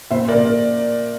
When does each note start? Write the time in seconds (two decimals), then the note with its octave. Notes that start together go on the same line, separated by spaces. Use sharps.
0.11 A#2 C5 E5
0.28 A#4 D5
0.35 A#2
0.45 A#4